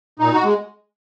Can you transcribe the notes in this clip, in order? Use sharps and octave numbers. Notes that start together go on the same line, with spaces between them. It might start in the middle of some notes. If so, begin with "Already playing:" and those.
A#2 D#4
F#4
G#3